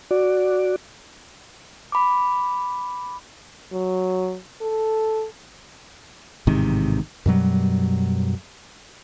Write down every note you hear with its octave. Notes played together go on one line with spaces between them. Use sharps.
F#4 D5
B5 D6
F#3
A4
A1 G#2 C3 D#3
F#2 B2 F#3 G3